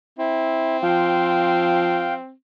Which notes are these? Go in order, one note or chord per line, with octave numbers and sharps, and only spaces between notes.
C4 E4
F3 F5 G5